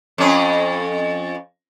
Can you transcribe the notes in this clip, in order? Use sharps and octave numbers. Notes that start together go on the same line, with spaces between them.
F2 C#4